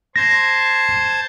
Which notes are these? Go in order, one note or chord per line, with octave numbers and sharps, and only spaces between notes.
C5 A5 G#6 A#6